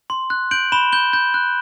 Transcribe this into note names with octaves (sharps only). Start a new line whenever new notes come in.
C6
F#6
G6 D7 F#7
B5 E7 G7
G6 E7 G7
G6
F#6